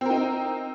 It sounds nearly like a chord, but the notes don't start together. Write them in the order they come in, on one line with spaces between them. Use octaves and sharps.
C4 A#4 D#4